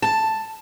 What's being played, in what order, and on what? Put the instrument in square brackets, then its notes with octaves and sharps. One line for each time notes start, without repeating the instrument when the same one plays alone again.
[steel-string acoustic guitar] A5